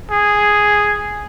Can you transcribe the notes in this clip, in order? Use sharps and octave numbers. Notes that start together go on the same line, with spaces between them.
G#4